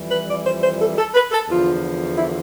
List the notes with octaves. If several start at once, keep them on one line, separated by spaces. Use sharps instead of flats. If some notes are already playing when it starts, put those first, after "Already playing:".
Already playing: F2 E3 G3
B4
D5
C5
C5
A4
A4
B4
A4
E2 D3 F3 F4
E4